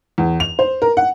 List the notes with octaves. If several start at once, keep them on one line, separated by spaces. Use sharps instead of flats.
E2
F7
C5
A#4
F#5